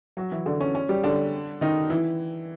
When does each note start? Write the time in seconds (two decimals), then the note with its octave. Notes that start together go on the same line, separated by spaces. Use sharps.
0.17 F#3 F#4
0.32 E3 E4
0.46 D3 D4
0.61 C#4
0.75 C#4
0.89 G3 G4
1.03 D3 D4
1.61 D#3 D#4
1.90 E3 E4